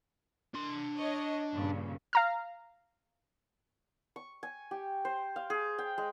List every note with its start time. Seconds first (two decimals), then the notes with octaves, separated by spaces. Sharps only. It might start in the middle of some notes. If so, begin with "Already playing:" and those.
0.54 D4 C6
0.98 C#5 D#5
1.53 G2 A#2 C#3
2.13 F5 A#5 F6
4.16 C#6
4.43 G#5
4.71 G4
5.05 C5
5.36 F5
5.50 G#4
5.78 G5
5.98 G#3